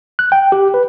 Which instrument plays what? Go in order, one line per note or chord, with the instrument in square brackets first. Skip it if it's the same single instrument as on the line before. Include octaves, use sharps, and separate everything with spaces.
[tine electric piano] F#6
G5
G4
B4